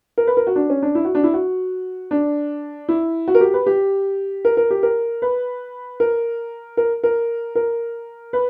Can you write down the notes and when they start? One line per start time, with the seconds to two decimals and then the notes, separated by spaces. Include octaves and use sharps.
0.18 A#4
0.27 B4
0.37 A#4
0.47 F#4
0.56 D4
0.70 C#4
0.82 D4
0.95 E4
1.05 F#4
1.15 D4
1.24 E4
1.34 F#4
2.11 D4
2.89 E4
3.28 F#4
3.35 A#4
3.41 G4
3.54 B4
3.67 G4
4.45 A#4
4.57 A#4
4.71 G4
4.83 A#4
5.22 B4
6.00 A#4
6.77 A#4
7.04 A#4
7.55 A#4
8.33 B4